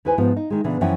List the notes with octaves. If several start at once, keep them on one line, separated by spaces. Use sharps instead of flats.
D#2 E4 B4 C5 G#5
G#2 F3 B3 F4
D#4
D#3 G#3
A#2 C#3 E3 B3 D4
F#2 E3 F3 C#4 F#5 G5